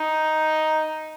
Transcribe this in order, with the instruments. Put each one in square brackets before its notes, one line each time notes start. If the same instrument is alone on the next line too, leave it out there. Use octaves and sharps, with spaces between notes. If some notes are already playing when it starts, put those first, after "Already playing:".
Already playing: [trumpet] D#4